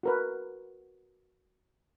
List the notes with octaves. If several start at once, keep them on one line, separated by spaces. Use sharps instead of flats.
F#4 A#4 B4